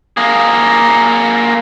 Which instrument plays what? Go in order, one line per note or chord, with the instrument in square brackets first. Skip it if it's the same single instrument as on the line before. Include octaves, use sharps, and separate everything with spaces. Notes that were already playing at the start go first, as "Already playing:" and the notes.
[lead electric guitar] A#3 G#4